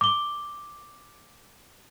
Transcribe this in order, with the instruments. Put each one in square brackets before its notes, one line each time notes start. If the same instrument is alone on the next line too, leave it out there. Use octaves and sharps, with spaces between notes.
[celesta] D6 G7